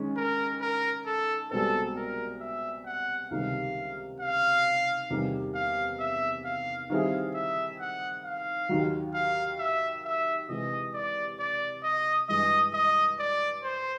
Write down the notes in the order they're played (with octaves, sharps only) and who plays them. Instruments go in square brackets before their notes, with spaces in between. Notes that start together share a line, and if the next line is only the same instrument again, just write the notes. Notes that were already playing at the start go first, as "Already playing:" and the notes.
Already playing: [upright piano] D#3 G#3 C#4
[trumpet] A#4
A#4
A4
[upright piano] C2 B2 G#3 C4 [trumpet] A4
[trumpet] A#4
E5
F#5
[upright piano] C#2 C3 D#3 G3 A#3 [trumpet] F5
[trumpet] F5
[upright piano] E2 C3 D#3 G3 A#3
[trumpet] F5
E5
F5
[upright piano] D#3 G3 C4 E4 G#4 [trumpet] F5
[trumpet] E5
F#5
F5
[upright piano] D#2 D#3 F#3
[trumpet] F5
E5
E5
[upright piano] C3 E3 G#3 [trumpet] D#5
[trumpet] D5
D5
D#5
[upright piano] G2 E3 G#3 [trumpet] D#5
[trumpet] D#5
D5
C5